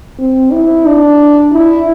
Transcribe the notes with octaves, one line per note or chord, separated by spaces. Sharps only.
C4
E4
D4
E4